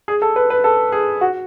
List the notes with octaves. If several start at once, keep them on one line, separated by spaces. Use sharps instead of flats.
G#4
A4
B4
B4
A4
G#4
F#4